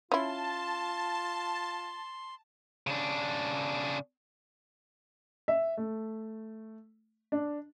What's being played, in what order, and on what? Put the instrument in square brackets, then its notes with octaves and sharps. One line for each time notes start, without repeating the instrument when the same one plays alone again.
[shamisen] C#4 E4 [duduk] F4 [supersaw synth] A5 [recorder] C6
[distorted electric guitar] C#3 D4
[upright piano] E5
A3
D4